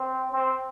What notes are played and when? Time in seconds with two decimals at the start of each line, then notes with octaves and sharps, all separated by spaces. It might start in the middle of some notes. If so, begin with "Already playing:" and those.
Already playing: C4
0.32 C4